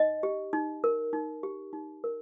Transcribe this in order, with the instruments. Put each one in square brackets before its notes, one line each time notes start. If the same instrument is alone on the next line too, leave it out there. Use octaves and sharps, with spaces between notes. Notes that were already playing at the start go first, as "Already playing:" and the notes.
Already playing: [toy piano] D#4 D#5
G4
D#4
A#4
D#4
G4
D#4
A#4